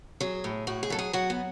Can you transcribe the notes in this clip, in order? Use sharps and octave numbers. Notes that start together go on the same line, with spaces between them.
F#3 G#4
A2
A2 F#4
G#4
F#3 A4
G#4
F#3 F#4
B3